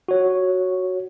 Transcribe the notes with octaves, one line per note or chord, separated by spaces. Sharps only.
F#4 C#5